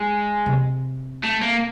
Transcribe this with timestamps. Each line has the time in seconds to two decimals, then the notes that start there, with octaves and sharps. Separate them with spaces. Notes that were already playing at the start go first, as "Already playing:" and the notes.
Already playing: G#3
0.46 C3
1.23 A3
1.41 A#3